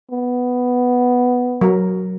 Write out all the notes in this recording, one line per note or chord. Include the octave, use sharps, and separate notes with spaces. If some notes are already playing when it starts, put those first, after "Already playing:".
B3
F#3 A#4